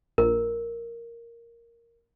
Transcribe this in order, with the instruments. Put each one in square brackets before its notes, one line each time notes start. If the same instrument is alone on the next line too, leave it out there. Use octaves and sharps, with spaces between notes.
[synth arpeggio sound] A#1 [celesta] A#4